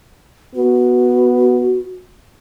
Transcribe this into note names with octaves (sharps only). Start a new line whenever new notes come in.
B3 F#4